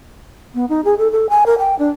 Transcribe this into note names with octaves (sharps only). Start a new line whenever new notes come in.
B3
D#4
G#4
A4
A4
G#5
A#4
G5
D4